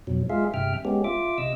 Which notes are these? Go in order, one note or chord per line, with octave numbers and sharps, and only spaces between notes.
F2 B2 F#3
G#3 F4 G#4 E5 F5
G2 C3 E5 G5 F6
G#3 B3 C#4 G4
F4 E5 D6
C3 D#5 E6